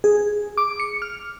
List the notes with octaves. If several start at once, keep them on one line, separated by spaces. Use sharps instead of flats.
G#4
D6
C#7
F6